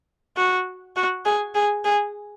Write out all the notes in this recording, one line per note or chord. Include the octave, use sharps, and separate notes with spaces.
F#4
F#4
G#4
G#4
G#4